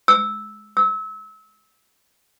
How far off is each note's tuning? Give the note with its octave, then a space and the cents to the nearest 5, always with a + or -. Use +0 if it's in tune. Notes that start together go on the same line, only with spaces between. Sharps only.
E6 -10
E6 -30